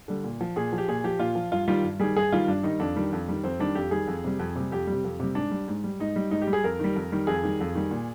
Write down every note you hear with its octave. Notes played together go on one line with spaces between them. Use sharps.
D3 G3
A#2
F3
A#2 G#4
F3
G4
A#2 G#4
F3 G4
A#2 F4
F3
G2 F4
D#3 G3 F4
G2
D#3 G3 G#4
G2 G#4
D#3 G3 F4
G2 D4
D#3 G3 D#4
F2 D4
D#3 G3
F2
D#3 G3
F2 C4
D#3 G3 D4
F2 G4
D#3 G3 G#4
F2
C3 G3
F2
C3 G3
F2 G4
C3 G3
F2
C3 G3
G#2 D4
G3
G#2
G3
G#2 D#4
G3
G#2 D#4
G4
G3
G#4
F2 A#4
D#3 G3
F2
D#3 G3
F2 G#4
D#3 G3
F2
D#3 G3
A#2